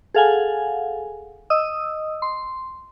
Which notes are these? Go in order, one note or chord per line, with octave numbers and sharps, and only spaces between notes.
G#4 A4 F5 F#5 G#5
D#5 D#6 E6
C6